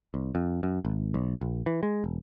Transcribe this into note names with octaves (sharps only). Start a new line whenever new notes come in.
C2
F2
F#2
G#1
B1
A#1
E3
G#3
E1